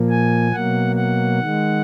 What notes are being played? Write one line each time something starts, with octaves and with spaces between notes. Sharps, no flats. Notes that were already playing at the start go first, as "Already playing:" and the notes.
Already playing: A#2 F3 A#3
G#5
B2 F#3 A#3 F#5
F#5
D#3
G#3